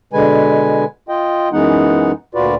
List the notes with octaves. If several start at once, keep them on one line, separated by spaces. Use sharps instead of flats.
B2 D3 G#3 B4 G#5
F4 D#5 G5
F#2 E3 G#3 B3 D#4 F#5
D2 A#2 F4 F#4 B4 D5